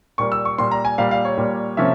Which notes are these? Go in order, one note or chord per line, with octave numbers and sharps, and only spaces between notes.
A#2 G3 A#3 C#6
E6
C#6
A#2 G3 A#3 C6
A#5
G#5
A#2 G3 A#3 F5
F5
C#5
A#2 G3 A#3
C3 F3 A#3 C#4 E5